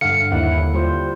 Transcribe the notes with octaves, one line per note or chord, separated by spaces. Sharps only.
G2 D3 F5 F#5 C#7
D#2 E4 F#5
D3
G3 F4 C5